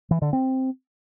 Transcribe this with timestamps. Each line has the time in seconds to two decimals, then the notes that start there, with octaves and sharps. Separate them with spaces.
0.11 E3
0.22 D3
0.33 C4